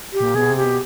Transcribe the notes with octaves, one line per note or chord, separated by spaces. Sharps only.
G4
A#2
B2 G#4
C3
G4
B2